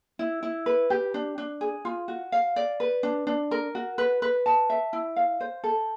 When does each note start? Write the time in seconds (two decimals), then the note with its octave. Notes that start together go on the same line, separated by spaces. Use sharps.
0.19 E4
0.43 E4
0.66 B4
0.90 G4
1.14 D4
1.38 D4
1.61 G#4
1.85 F4
2.08 F#4
2.32 F5
2.56 D5
2.80 B4
3.03 D4
3.27 D4
3.51 A#4
3.75 F#4
3.98 B4
4.22 B4
4.46 A5
4.70 E5
4.93 E4
5.16 F5
5.41 C5
5.64 A4